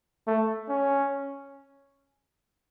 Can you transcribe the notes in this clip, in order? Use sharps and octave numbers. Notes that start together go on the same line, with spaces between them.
A3
C#4